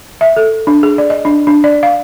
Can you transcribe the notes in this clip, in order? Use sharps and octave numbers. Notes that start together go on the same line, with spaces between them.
E5
A4
D4
G#4
D5
D#5
D4
D4
D5
F5